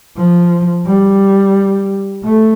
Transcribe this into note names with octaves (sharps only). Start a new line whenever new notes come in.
F3
G3
A3